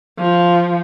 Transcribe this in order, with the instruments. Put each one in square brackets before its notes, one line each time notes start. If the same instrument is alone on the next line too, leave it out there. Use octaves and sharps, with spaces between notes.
[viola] F3